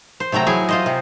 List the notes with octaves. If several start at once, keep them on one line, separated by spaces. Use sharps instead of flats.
C5
C3 F#3 A3 G5 A#5
F#3 E4 G#4 G#5
F4 C5 D#5
C3